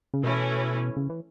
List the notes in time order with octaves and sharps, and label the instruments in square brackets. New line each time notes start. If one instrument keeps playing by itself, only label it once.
[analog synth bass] C#3
[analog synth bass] B2 [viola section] E3 A3 C#4 E4
[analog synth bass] C#3
E3